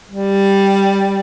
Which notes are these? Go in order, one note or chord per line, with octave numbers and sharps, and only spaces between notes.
G3